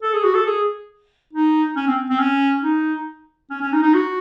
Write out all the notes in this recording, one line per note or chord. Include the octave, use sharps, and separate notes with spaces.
A4
G#4
F#4
A4
G#4
D#4
C#4
C4
C4
C#4
D#4
C#4
C#4
D#4
D#4
F#4